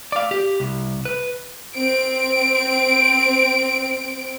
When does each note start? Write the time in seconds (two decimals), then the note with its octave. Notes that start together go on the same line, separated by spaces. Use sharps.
0.12 D5 F5
0.31 G4
0.60 C2
1.05 B4
1.76 C4 D7